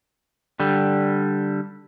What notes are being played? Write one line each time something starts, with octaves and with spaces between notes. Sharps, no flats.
D3 G3